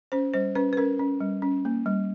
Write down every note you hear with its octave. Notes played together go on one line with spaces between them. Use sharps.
C#4 C5
G3 C5
C#4 B4
B4
C#4 A#4
C#4
G3
C#4
A#3
G3